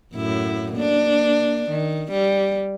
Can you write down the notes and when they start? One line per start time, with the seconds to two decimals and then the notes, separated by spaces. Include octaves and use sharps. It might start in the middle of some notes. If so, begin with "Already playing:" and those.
0.14 F#2 A2 E4
0.73 A#3 D4
1.70 D#3
2.12 G3